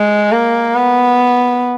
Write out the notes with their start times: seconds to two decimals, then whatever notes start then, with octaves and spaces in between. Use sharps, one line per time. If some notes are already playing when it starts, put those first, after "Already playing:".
Already playing: G#3
0.32 A#3
0.75 B3